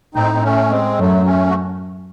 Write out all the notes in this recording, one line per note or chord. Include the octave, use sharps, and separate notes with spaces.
A2 C4 D#4
C4
A3 C#4
G#3 C4
F#2 F#3 A3
A3 C#4
F#4